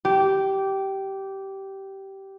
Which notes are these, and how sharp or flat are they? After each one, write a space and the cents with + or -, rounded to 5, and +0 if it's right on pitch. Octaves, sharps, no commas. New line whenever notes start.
G4 -15